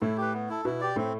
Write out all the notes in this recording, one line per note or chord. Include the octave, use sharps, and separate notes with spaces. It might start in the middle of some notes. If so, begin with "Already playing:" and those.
A2 A3 E4
G4 B4
B3
E4 A4
B2 B3 E4
G4 D5
A2 A3 C4